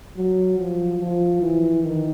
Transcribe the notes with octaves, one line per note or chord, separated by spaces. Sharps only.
F#3
F3
F3
E3
D#3